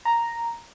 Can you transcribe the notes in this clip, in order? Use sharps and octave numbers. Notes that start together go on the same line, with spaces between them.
A#5